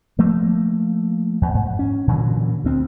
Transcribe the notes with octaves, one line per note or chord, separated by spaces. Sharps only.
F3 A3 A#3
E2
G#2
C#4
A#2 D3 E3 F#3
D2 C4